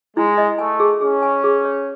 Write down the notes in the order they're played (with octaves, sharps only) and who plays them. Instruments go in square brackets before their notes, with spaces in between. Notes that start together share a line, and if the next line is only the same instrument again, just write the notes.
[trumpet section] G#3 [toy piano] E4
[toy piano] D#5
[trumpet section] A3 [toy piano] G#5
[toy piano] G#4
[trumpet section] C#4 [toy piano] G#4
[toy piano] G#5
G#4
C#5